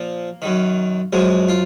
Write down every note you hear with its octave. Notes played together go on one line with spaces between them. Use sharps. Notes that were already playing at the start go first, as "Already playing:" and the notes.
Already playing: A#2 F3 A#3
F#2 D#3
F#2 F3 G#3
F4